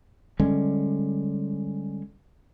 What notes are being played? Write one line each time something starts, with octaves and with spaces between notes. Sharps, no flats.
D3 G3 G#3 C#4